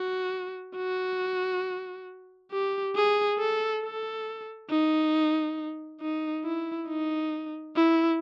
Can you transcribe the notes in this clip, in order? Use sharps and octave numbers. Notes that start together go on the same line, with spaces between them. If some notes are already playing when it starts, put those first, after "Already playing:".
Already playing: F#4
F#4
G4
G#4
A4
A4
D#4
D#4
E4
D#4
E4